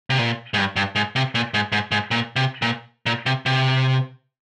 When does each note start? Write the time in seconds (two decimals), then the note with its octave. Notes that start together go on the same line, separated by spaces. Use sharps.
0.10 C3
0.19 A#2
0.54 G#2
0.58 G2
0.76 G2
0.95 G#2
1.16 C3
1.35 A#2
1.54 G#2
1.72 G#2
1.92 G#2
2.11 A#2
2.36 C3
2.62 A#2
3.06 A#2
3.26 C3
3.46 C3